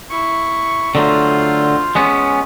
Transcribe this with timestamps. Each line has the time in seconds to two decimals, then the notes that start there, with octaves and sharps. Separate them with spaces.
0.10 E4 C#6
0.95 D3 F#3 A3 F4 C5
1.95 G#3 B3 C#4